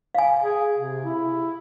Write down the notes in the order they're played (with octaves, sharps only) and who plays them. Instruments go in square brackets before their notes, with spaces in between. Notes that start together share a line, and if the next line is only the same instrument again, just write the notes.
[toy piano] F5 G#5
[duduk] G#4
C3
E4